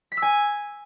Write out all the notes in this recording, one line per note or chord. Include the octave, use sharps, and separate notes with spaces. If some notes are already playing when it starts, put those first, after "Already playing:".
B6
E6
G#5